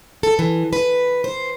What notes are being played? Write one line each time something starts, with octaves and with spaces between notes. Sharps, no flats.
A4
E3
B4
C5